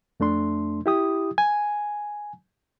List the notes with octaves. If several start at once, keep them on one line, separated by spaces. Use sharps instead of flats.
F2 A3 D4 C6
E4 G4 D#6
G#5